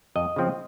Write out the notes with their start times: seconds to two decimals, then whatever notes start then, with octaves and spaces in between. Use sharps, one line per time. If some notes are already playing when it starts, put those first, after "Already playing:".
0.15 F2 D#5
0.36 C#3 F3 C4